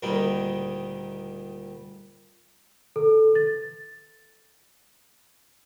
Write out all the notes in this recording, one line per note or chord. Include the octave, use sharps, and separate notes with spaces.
D2 A#2 D#3 G3 D#4
A4
A6